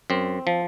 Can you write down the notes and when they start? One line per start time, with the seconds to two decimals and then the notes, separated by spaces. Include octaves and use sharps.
0.10 F#2 C4
0.47 F3